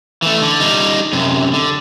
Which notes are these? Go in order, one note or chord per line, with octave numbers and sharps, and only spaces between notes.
E3 A3
D3
G3 D#4
F#2 C3
D3